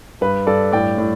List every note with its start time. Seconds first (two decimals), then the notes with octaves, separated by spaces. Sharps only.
0.21 G2 B4
0.47 G2 A4 D5
0.72 A2 D5 G5
0.98 A2